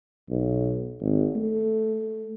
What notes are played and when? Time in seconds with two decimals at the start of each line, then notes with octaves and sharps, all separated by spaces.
0.30 B1
1.00 G#1
1.35 A3